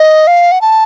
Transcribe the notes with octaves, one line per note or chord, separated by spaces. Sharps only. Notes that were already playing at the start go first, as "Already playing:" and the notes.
Already playing: D#5
F5
F#5
A5